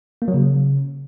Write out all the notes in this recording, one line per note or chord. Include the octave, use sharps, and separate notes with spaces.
A#3
F#3
C#3